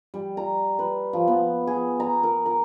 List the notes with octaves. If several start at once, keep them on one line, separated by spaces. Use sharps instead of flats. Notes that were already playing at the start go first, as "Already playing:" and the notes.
G3
A#5
B4
F3
B3
G#4
A#5
A#4
A#4